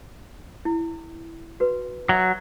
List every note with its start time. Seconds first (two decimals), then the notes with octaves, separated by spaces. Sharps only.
0.65 E4
1.60 F#4 B4
2.09 F#3 E5